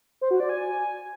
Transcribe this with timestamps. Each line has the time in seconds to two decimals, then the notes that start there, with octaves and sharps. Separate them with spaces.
0.21 C5
0.31 F#4
0.40 D5
0.49 G#5